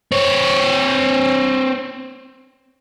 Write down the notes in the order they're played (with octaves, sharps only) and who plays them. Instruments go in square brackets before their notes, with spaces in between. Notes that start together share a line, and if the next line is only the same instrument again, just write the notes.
[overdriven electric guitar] C4 C#5